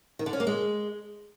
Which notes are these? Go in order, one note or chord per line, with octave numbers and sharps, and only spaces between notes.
D#3
D3
C#4
A#3
G#3